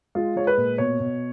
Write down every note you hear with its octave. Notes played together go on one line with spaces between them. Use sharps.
G#3 F4
G#3 C#5
B4
A#2
B2 C#5
B2